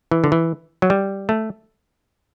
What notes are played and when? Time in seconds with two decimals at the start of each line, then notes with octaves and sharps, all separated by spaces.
0.11 E3
0.24 D3
0.32 E3
0.82 F#3
0.90 G3
1.29 A3